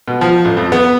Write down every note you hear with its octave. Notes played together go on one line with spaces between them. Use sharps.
B2
F3
A1
F2
B3